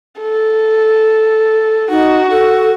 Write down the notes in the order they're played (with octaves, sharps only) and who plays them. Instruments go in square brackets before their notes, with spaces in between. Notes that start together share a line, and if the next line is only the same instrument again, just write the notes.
[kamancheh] A4
[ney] D#4 [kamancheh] F#4
[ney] A4